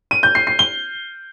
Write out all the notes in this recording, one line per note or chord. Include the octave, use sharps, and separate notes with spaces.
D#7
G6
C7
C7
G7